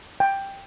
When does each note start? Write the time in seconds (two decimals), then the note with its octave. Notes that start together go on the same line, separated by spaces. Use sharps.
0.20 G5